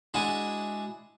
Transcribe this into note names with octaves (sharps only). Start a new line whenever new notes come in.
G#3 D4 E4 F#4 G#5